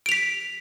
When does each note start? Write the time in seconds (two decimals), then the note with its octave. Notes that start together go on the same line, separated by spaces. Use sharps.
0.06 D7
0.09 F7
0.12 B6